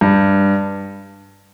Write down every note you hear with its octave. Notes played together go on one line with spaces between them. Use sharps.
G2